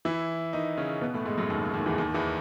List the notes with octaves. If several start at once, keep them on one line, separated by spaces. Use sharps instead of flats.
E3 E4
D#3 D#4
C#3 C#4
B2 B3
A2 A3
G#2 G#3
F#2 F#3
D#2 D#3
C#3
D#2 D#3
E2 E3
D#2 D#3
E2 E3